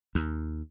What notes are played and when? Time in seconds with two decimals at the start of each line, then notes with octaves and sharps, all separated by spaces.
0.15 D#2